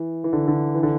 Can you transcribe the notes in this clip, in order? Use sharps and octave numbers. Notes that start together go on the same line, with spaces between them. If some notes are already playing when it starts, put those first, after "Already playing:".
Already playing: E3
E3
D3
D3
E3
D3